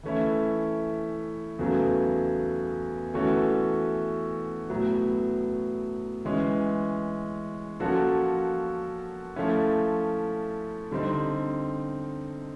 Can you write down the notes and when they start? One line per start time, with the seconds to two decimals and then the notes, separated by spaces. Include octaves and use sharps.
0.03 E3 A3 C#4 E4
1.59 E2 C#3 F#3 A3
3.14 E3 A3 C#4 F#4 A4
4.70 A2 F#3 B3
6.25 E3 G#3 C#4
7.80 F3 A#3 C#4 F#4 A4
9.36 F3 A3 C#4 E4
10.91 D3 G3 C4 D#4